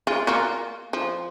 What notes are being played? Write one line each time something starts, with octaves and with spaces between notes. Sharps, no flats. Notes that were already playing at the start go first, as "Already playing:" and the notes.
G#3 F4
A#3 F4 F#4
F3